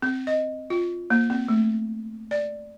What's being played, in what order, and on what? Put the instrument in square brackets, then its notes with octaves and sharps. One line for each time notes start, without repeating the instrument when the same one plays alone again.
[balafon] C4
D#5
F4
A#3
C4
A3
D5